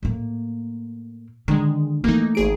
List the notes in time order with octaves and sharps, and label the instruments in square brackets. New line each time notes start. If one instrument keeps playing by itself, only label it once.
[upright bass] A2 A#3
[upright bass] D3 [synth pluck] D#3 G#3
[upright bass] E3 A3 [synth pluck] A#3 D#4
[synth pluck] G#1 G#4 D7